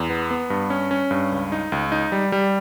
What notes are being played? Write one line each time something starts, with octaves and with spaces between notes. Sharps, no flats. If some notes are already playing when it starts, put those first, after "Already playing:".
Already playing: E2
B3
B3
G2
C#4
C#4
G2
C#2
D#4
C#2
D#4
G3
G3